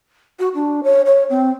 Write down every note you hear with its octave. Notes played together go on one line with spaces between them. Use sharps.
F#4
D4
C#5
C#5
C4